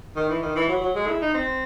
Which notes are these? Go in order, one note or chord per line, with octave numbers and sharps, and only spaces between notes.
D#3
E3
D#3
E3
F#3
F#3
G#3
E4
D#4
C4